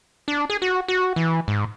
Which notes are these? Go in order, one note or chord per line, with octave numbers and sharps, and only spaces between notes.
D4
G#4
F#4
F#4
E3
G#2